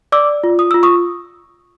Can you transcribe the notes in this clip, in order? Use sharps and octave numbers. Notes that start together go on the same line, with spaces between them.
D5 D6 E6
F4
D#6
F4 E6
C#6 D#6